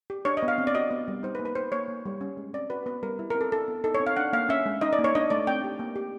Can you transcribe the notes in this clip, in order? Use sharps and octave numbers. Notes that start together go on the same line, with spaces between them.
G4
D4 C#5
D#5
B3
F5
C4
D5
F#4 D#5
B3
G3
D#4 C5
B4
A#3
B4
D#4 C5
A#3 C#5
A#3
G3
C#4
G#3
C4 D5
F#4 B4
B3 B4
G3 A#4
E4
A#4
C4
A4
D4 A4
B3
D#4 A4
C#5
C4
F5
D4 F#5
A#3 F5
C#4 E5
G#3
D#4 D#5
D5
A#3
C#5
D4 D#5
A3 D5
C4 G5
G4
A#3
G4